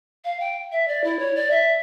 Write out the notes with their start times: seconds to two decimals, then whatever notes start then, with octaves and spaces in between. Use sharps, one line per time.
0.24 F5
0.40 G5
0.72 E5
0.88 D5
1.04 E4
1.19 C#5
1.35 D5
1.50 E5